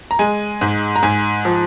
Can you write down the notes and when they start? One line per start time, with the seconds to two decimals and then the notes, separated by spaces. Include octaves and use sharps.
0.11 A#5
0.19 G#3 G#5
0.61 G#2
0.96 A#5
1.03 G#2 G#5
1.45 F3